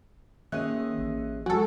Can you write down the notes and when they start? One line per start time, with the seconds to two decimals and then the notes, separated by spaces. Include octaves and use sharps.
0.52 D#3 A#3 C#4 G#4 D#5 E5 F#6
0.98 A1
1.46 F#3 G#3 F#4 A4 G#5